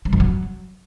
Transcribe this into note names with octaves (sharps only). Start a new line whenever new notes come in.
G3
F2
F#3